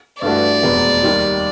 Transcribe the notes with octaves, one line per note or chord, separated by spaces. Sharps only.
G2 E3 A3 D4 F#4 D5
F1 E2 B2 G#3
D#2 D#3 G3